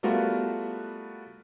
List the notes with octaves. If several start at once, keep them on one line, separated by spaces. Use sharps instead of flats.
G3 A3 B3 F4 F#4 A#4